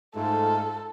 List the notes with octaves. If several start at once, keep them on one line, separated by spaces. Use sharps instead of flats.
G#2 A3 F4 A4